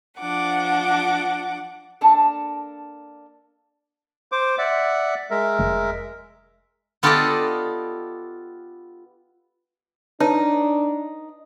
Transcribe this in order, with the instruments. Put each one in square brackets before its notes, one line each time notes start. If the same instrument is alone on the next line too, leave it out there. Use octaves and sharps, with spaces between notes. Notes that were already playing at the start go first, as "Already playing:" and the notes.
[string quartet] F3 D4 F#5 D6
[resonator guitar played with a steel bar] A#3 D4 A4 A5
[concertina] C5 D6
D5 E5 F#5
G#3 A#4 E5
[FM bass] F1
[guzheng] B3 F4 G4 A4 D5 D#5
[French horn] D4 [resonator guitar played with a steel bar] D#4 [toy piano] B4 C#5 A5